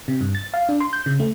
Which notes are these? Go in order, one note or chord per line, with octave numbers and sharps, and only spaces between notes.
C3
G2
A6
F5
D4
C6
G6
C#3
A3